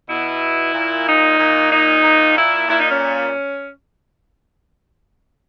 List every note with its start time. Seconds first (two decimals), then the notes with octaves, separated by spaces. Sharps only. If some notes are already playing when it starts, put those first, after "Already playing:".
0.08 B2 E4
0.74 A#2
1.07 D#4
1.39 A#2
1.71 D#4
2.03 A#2
2.36 E4
2.68 A#2 E4
2.80 D#4
2.91 C#4